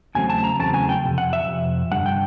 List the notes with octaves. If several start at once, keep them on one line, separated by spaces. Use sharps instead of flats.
E2 C#3 F#3 A3 C4 G#5
A5
A#5
E2 C#3 F#3 A3 C4 A5
G#5
G5
F2 C3
F#5
E5
F2 C3
G2 D3 G3 F#5
G5